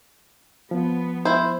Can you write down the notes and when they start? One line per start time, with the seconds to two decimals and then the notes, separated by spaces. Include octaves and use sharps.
0.71 F3 B3
1.25 E4 C5